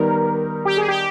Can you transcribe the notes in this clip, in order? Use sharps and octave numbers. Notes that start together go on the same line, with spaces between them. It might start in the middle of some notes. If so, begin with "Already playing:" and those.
Already playing: D#3 G3 B3 D#4 A#4
G4
G#4
G4